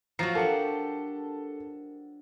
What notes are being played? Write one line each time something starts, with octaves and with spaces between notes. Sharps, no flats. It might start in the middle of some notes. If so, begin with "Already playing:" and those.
F3 F#3 F#4 A#5 A#6 C7
D4 G4 A4 A#4 F#5 C#7